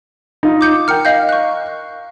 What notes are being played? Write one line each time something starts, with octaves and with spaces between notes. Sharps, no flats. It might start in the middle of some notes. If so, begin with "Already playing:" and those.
D#4 F4 D#5
D6 G6 C#7
A#4 G5 F6 C#7
D#5 F5 G6
C#6 F#6